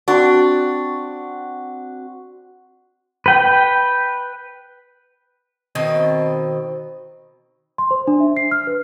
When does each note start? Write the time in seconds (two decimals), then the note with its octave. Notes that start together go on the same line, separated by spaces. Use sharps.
0.08 C4 D4 F#4
3.26 B4 G5
5.75 B2 D#3 C4 D#5
7.78 C6
7.91 C5
8.08 D4
8.20 E5
8.37 C7
8.51 F6
8.67 B4